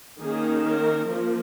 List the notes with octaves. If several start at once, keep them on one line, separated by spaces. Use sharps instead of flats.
D#3 A#3 C#4 G#4
A#4
F3 A#3